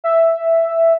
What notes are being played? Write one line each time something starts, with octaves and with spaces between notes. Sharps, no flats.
E5